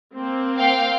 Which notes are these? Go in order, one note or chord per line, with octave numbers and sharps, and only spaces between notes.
A#3 C4
F5 G5